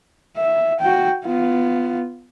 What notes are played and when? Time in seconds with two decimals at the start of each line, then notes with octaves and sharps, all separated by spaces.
0.37 E5
0.80 F#4 G5
1.25 B3 F4